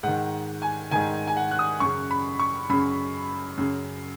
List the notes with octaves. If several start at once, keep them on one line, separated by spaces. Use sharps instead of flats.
G#2 D#3 F#5
G#5
G#2 D#3 G#5
G#5
F#5
F#6
D#6
F#2 C#3 C#6
B5
C#6
F#2 C#3 B5
F#2 C#3